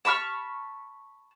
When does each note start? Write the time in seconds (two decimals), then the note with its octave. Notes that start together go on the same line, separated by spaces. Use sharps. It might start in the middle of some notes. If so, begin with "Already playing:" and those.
0.05 A5 B5 C#6 F6